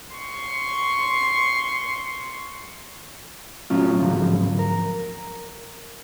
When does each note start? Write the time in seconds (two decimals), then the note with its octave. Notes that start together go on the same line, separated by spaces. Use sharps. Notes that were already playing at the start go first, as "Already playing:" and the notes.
0.17 C6 C#6
3.70 A2 F#3 C#4 F4
4.01 D2 G#2 F3 F#3
4.59 A#4